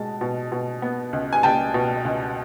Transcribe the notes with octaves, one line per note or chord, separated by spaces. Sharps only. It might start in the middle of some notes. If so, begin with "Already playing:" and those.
Already playing: B2 G#3 A5
B2
B2
B3
C#2
G#5
C#2 G5 A5
B2
C#2